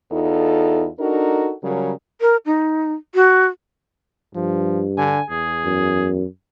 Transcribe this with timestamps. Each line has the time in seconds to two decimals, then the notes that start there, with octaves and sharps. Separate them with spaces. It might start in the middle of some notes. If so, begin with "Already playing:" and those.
0.12 E2 D#4 F4 A4
1.00 D4 D#4 F#4 A4 A#4
1.63 C#3 F#3 G3 G#4 A#4
2.21 A#4
2.46 D#4
3.15 F#4
4.35 G2 F3
4.98 D3 G#5
5.30 E2 G#4
5.65 F#2